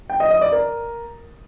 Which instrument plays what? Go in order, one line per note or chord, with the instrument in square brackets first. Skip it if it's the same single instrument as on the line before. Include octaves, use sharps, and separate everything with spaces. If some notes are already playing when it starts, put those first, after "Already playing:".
[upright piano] G5
D#5
D#5
D5
A#4